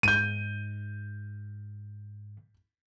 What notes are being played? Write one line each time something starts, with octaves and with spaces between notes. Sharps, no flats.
G#2 G6 D#7